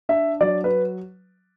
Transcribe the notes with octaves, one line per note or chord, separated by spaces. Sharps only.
D4 E5
F#3 D5
B4